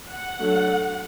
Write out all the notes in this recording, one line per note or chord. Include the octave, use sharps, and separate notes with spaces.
F#5
F#3 A3 D4